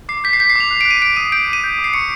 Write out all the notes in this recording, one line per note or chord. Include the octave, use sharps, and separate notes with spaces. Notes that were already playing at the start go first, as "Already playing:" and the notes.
D6 C7
G6 B6
C7
G6 B6
C7
D6 F7
F#6
D7
F#6
D#7
F#6 D7
D#6 D#7
G6 D7
D6
D#7
G6
D6
C7
C#6 C#7